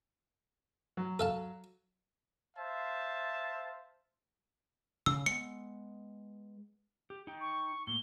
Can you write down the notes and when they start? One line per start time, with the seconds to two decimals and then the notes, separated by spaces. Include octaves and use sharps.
0.97 F#3
1.19 A4 F5 A5
2.56 C5 E5 F5 A5
5.06 C#3 E6
5.26 G#3 B3 C#7
7.10 G4
7.27 D#4 G5
7.41 C#6
7.87 A2 A#3 G7